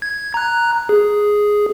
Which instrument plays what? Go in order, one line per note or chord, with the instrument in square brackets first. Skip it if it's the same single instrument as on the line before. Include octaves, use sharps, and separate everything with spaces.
[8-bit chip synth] G#6
A#5 F#6
G#4